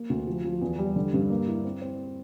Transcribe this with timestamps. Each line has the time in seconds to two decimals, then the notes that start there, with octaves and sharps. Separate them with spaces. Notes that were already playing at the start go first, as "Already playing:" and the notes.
Already playing: A#3
0.10 D2
0.27 F3
0.45 F3
0.61 E2
0.79 G3
0.96 D3
1.14 G2
1.30 A#3
1.48 E4
1.65 C4
1.82 C4